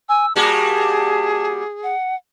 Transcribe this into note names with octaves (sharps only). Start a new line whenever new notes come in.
G#5 E6
G3 A#3 F#4 G#4 A5
F#5